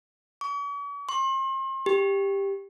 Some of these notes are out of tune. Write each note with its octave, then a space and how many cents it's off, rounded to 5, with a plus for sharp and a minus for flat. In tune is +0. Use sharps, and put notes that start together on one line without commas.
C#6 +45
C6 +40
G4 +10